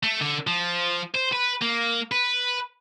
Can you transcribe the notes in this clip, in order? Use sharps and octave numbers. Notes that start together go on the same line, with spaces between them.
A3
D3
F3
C5
B4
A#3
B4